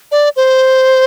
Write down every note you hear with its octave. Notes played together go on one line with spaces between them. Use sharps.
D5
C5